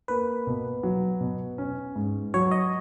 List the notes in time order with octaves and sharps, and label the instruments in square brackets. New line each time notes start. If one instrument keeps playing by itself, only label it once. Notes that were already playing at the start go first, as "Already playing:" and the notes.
[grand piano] A#3 [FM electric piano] B4
[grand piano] B2
F#3
B2
C#4
G#2
[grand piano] F#3 [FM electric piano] C#5
[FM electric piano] D#5